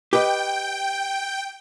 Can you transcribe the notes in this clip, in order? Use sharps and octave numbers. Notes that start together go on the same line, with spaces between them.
G4 B4 D#5 G5